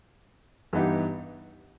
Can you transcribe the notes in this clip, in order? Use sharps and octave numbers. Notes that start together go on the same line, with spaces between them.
G2 E3 B3 D#4 G4